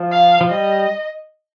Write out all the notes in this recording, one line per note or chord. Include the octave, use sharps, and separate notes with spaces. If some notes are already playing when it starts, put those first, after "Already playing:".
Already playing: F3
F5
F3
G3 D#5